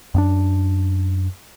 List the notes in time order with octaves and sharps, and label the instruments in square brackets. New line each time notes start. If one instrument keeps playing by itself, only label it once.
[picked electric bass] F#2 B3 D4